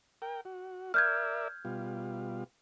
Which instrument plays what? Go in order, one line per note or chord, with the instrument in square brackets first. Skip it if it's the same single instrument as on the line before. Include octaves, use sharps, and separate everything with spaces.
[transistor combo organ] A#4 G5
F#4
[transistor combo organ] A#4 D5 E5 [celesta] F6 G6 G#6
[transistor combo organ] B2 G3 F4